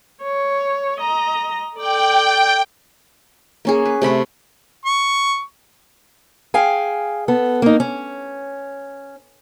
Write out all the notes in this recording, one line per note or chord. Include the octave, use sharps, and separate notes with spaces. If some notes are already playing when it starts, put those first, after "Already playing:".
C#5
D#5 A#5
A4 D5 G5
A#3 C#4 G#4
B4
C3 A3 B5 D6
C#6
G#4 F5 G5 G#5
B3 A4
A#3 D#4
C#4